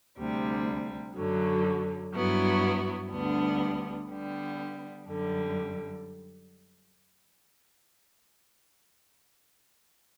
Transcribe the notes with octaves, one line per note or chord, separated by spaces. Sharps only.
D2 C3 G3
F#2 D3 F#3
G2 F#3 B3 E4
D2 D3 G3 B3 D4
D3 G3 B3
F#2 D3 G3